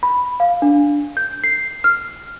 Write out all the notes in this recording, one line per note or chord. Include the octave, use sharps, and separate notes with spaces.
B5
F5
D4
G6
C7
F6